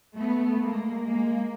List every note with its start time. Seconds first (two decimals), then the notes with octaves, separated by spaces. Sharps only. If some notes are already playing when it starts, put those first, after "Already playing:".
0.18 A3 B3
0.62 G#3 A#3
1.06 G#3 A#3